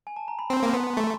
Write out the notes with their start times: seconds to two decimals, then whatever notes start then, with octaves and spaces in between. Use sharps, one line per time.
0.07 G#5
0.16 A5
0.28 A#5
0.39 B5
0.50 C4 C6
0.62 A#3
0.73 B3
0.97 A3 C#6